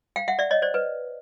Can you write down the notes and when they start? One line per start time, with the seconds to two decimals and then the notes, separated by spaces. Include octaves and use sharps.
0.16 F5 G5
0.28 E5 F#5
0.39 D5 E5
0.51 C#5 D#5
0.62 C5 D5
0.74 B4